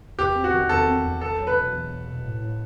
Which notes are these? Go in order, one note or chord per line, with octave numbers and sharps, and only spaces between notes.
E2 G4
C4
F#4
D#3
E2 A4
C4
E2
E2 A4
F#3
B4
B2
E2
E2
B2
A2
A2